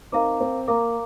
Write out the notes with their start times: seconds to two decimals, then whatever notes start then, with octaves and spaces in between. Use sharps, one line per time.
0.12 C4 D#4 A#4 F5 A#5 D6
0.40 C4
0.68 A#3 A#4 F5 A#5 D6